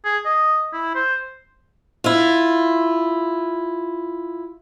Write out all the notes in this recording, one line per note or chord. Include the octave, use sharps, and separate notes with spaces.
G#4
D#5
E4
C5
E4 F4